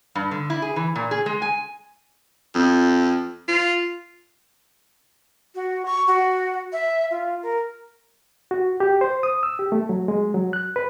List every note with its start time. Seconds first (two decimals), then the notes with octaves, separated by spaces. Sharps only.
0.15 G2
0.31 D3
0.50 E4
0.62 G#4
0.76 E3
0.95 A#2
1.11 G#4
1.26 G#3
1.42 G#5
2.55 F2
3.48 F4
5.55 F#4
5.85 C#6
6.07 F#4
6.72 E5
7.11 F4
7.43 A#4
8.51 F#4
8.80 G4
9.01 C5
9.23 D#6
9.43 E6
9.59 G4
9.72 A3
9.89 F#3
10.08 G#3
10.34 F#3
10.53 F#6
10.76 B4